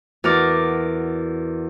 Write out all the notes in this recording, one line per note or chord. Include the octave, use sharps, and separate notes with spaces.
E2 F#4 A#4 D5